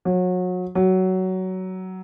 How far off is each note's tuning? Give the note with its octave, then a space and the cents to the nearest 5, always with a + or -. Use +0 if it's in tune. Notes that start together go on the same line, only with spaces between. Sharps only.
F#3 -30
F#3 +15